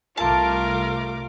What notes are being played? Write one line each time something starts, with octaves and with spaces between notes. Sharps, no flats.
C2 A3 F4 A#4 A5 D6